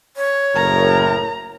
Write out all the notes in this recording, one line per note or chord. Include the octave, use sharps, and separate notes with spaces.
C#5
F#1 A2 A#4 A#5